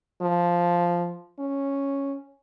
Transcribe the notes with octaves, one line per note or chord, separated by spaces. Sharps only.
F3
C#4